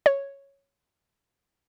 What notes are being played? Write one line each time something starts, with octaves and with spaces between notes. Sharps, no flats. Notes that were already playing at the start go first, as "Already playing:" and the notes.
C#5